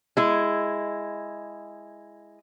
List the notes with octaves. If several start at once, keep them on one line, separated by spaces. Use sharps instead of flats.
G#3 E4